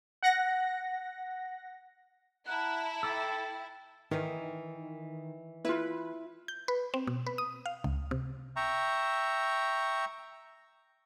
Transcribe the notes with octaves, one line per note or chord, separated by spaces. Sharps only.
F#5 A#6
E4 F#5 A5 A#5
A4 G5 D6 E6
D#3 E3 D#4
E4 F4 B4
G6
B4
C4
B2
B4
D#6
F5
C#2
C3
E5 G5 A#5 C#6